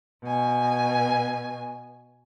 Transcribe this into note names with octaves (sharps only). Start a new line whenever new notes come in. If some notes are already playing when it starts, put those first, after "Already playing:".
B2 G#5